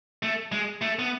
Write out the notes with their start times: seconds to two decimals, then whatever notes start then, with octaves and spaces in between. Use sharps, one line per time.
0.23 A3
0.52 G#3
0.82 A3
0.99 B3